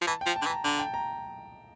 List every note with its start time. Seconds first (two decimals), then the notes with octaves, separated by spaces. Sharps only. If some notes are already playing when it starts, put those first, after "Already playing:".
0.01 F3
0.07 E3 A5
0.21 G5
0.26 F3
0.36 A5
0.42 D3
0.46 E3
0.50 A#5
0.64 D3 A5
0.79 G5
0.94 A#5